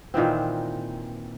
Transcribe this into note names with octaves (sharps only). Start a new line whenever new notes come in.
A#2 D#3 E3 C4